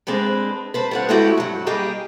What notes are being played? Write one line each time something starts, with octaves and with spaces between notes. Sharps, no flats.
G#3 C4 D4 B4
B4 C5 A5
G3 C#5 F#5
G#3 A3 C#4 E4 F#4 G4
G2 F#3
G3 A#3 G4 G#4 D#5